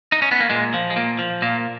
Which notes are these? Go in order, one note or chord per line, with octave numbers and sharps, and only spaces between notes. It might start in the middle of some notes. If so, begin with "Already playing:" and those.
D#4
C#4
B3
A#3
A#2 G#3
F3
G#3
A#2 A#3
F3
A#2 A#3